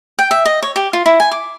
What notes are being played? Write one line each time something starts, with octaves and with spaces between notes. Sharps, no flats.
G5
E5
D#5
C#5
G4
F4
E4
G#5
D6